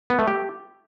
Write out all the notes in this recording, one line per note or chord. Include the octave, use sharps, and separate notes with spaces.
B3
A3
G4